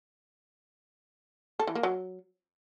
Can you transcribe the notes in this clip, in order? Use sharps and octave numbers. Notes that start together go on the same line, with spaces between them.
A4
E3
A#3
F#3